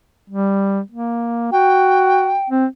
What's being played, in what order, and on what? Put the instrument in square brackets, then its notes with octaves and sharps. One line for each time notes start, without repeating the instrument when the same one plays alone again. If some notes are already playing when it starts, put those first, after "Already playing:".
[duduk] G3
A#3
[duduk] F#4 [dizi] G5
[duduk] C4